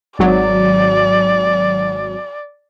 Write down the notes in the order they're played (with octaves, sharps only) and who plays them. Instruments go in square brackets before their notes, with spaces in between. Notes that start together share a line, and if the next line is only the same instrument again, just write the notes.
[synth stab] G#1 F#3 [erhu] D5